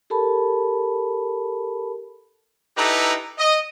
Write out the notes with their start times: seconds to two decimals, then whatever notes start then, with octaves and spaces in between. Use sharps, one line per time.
0.10 G4 A4 A#4 A5 B5
2.77 D#4 E4 G4 A4 B4 A#5
3.38 D#5